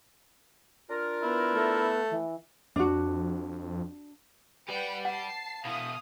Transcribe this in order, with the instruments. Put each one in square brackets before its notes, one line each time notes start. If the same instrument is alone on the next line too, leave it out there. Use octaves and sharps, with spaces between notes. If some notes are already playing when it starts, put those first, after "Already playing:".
[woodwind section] D4 F4 A#4
[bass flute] B3 [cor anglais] E4
[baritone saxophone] A3
[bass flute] E3
[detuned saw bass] F2 [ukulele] D4 F#4
[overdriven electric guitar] G4 D5 [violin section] B4 F#5 G5
[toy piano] F#5 [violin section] A5 C7
[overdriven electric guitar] B2 E4 [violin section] F5 D#6